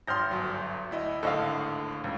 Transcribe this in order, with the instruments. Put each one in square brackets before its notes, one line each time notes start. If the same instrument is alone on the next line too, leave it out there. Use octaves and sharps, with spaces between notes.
[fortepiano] G#1 C6 [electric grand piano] F6 G6 A#6
[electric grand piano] G1 F#3
D2 E4 D#5
[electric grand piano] G#1 A2 D3 [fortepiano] A4 D#5 F5
[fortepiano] C#2